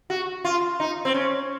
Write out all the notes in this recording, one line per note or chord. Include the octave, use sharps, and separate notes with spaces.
F#4
F4
D#4
C4
C#4